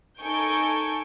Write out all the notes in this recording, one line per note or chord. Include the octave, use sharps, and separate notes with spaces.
D#4 A4 G#5 C#6 G6 D7